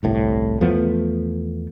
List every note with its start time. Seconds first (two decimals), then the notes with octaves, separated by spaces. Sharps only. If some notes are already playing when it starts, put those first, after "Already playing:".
0.03 G1 C2 A2
0.61 E2 F3 A3 B3